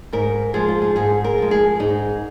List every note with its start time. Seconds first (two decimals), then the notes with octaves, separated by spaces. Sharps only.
0.13 G#2 A#4
0.54 F3 G#3 G#4
0.68 F4
0.82 G#4
0.96 G#2 G#4
1.24 A#4
1.38 F3 G#3
1.51 G#4
1.79 G#2 D#4